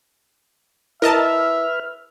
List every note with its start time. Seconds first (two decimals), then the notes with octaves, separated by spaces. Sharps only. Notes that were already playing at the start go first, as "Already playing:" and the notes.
1.02 E4 A#4 B4 D#5 E5 A5 F6